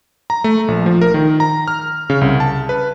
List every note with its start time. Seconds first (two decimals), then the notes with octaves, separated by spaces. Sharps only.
0.30 A#5
0.44 A3
0.68 A#1
0.86 F3
1.01 A#4
1.14 D#3
1.40 A#5
1.68 F6
2.10 C#3
2.21 C2
2.40 A5
2.69 B4